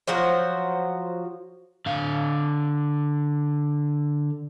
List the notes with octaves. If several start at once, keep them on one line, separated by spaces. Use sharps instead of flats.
F3 F#3 F#4 C5
D3 F5